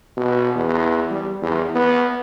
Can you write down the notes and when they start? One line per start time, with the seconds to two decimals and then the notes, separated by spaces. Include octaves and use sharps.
0.17 B2
0.55 E2
1.10 G3
1.42 E2
1.75 B3